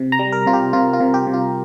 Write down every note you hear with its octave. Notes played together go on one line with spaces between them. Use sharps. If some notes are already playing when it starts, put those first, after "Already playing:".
Already playing: C3
A#5
G3
A#4
C3 F4
G4
C3 F4
F4
C3
G4
C3
F4